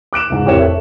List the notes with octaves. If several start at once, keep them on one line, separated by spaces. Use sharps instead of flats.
D6 F#6 D7 E7
C#2 G#2
F1 A2 G4 A#4 C#5 E7
A4 E5